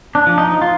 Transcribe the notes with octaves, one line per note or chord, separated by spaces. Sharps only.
D4
F3
D#4
F4